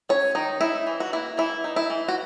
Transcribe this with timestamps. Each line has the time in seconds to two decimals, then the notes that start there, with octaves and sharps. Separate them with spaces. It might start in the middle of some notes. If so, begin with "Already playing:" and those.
0.09 C#4 C#5
0.35 D#3 D#4
0.61 D#4 E4
0.87 E3
1.00 F#4
1.13 A#3 E4
1.37 E3 E4
1.64 D#4
1.76 E4
1.90 E3
2.08 F#4